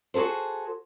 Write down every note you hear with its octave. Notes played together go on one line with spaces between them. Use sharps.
F#4 G#4 A4 C5